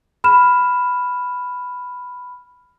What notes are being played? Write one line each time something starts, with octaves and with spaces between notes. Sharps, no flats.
B5 F6 E7